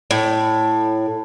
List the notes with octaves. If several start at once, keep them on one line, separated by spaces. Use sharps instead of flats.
A2